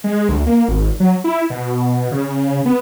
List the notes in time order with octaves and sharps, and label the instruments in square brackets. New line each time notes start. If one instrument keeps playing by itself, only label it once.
[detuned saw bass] G#3
D2
A#3
G#1
F#3
E4
B2
C#3
B3